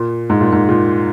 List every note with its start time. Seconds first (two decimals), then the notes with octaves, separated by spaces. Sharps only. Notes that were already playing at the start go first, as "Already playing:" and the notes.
Already playing: A#2
0.30 G#2
0.41 A#2
0.52 G#2
0.69 A#2